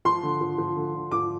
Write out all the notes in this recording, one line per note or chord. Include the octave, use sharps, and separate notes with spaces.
F3 C6
D3
F3
F3
D3
D3
F3 D6